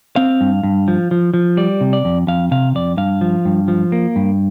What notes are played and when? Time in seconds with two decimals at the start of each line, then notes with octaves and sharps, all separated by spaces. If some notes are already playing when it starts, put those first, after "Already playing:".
0.16 C4 F5
0.41 G2
0.63 G2
0.88 F3
1.11 F3
1.34 F3
1.57 G3 D5
1.81 C3
1.93 D5
2.05 F2
2.27 F2 F5
2.51 C3 F5
2.75 F2 D5
2.97 G2 F5
3.21 F3
3.45 G2
3.68 F3
3.92 A#3
4.16 G2